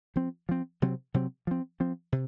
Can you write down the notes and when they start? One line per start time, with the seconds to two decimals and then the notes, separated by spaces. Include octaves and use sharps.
0.16 F3 C4
0.49 F3 C4
0.82 C3 F#3 C4
1.14 C3 F#3 C4
1.47 F3 C4
1.80 F3 C4
2.12 C3